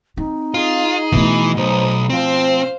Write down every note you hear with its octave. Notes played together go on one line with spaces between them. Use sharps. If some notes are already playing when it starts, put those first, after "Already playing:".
C4 D#4
F4 G#4 D#5
B2 E3 A3
B1 D#4 C5 D#6
F3 C4 C5 F5